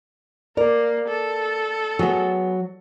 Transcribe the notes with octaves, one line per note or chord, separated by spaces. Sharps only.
A#3 A#4 D5
A4
F#3 B3 G#4